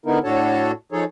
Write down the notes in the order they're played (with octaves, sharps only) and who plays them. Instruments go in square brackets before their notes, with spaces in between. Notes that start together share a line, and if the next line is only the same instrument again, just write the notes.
[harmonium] D3 B3 D#4 E4 A#4
A2 D4 F#4 A4 C#5 A5
F3 D#4 G#4 A4 C#5